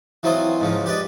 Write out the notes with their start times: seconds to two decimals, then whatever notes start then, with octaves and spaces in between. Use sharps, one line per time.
0.23 E3 F#3 C4 F4 D#5
0.61 G#2 C#3 F3
0.86 G4 B4 D5 D#5